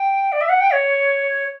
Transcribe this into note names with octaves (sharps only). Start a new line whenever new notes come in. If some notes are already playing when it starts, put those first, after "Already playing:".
Already playing: G5
D5
E5
F#5
G5
C#5